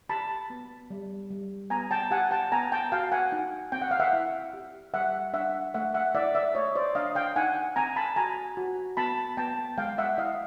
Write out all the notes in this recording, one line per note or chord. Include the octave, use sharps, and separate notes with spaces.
G4 A5 B5
B3
G3
G3
B3 G#5 A#5
G5 A5
G4 F#5 G#5
G5 A5
B3 G#5 A#5
G5 A5
F#4 F5 G5
F#5 G#5
D#4
C4 G5
F#5
F5
E5 F#5
E4
G4
G3 E5 F#5
D4 E5 F#5
A3 E5 F#5
E5 F#5
E4 D5 E5
D5 E5
A3 C#5 D#5
C5 D5
D4 D#5 F5
F5 G5
D#4 F#5 G#5
C4 G#5 A#5
A5 B5
F#4 G#5 A#5
F#4
B3 A5 B5
B3 G5 A5
G#3 F5 G5
E5 F#5
E4 D#5 F5